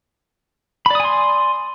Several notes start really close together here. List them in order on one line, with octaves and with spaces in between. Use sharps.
B5 D5 D#6 G#5 C6